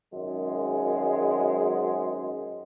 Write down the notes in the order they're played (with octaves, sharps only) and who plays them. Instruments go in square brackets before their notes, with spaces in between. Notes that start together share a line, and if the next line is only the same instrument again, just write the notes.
[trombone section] G#1 F#2 G#3